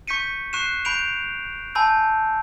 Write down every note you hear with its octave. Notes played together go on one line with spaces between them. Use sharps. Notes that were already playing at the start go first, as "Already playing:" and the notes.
C#6 G6 B6 C#7 D#7
C#6 F#6 C7 D#7 E7
B5 G6 D7 F7
G#5 A5 B5 E6 G6